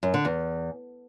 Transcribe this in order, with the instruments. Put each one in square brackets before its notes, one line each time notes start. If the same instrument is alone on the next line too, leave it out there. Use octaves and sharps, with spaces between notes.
[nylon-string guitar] F#2
D3
E2